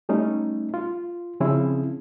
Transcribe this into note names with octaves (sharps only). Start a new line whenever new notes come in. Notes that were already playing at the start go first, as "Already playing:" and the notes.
G3 A3 C#4 D#4
F4
C#3 F3 C4 C#4 E4 G#4